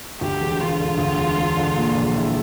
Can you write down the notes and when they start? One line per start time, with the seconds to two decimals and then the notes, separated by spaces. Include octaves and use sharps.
0.21 D2 G4
0.41 E1
0.60 E1 F4
0.79 D3
0.98 D2
1.18 E1
1.37 E1
1.56 D3
1.76 A#2
1.94 A#1
2.14 E4